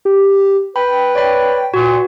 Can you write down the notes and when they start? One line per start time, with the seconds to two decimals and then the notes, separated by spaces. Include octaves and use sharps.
0.05 G4
0.76 B4 G5 B5
1.15 C#5 D5 B5
1.74 A#2 F#4 B4